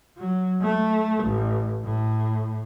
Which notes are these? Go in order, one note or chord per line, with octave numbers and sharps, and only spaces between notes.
F#3
A3
A1
A2